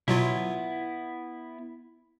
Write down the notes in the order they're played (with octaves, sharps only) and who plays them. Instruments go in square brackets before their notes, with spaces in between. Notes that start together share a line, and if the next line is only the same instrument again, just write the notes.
[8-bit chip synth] B2 F#3 F4 [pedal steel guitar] B3 E4